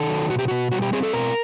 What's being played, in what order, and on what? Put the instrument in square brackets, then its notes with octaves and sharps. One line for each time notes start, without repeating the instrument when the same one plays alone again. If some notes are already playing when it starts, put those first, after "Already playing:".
Already playing: [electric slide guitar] D#3 A4
F#3
B2 F#4
G4
B2 F#4
G3 F#4
G4
C4 G#4
A4
B2 A#4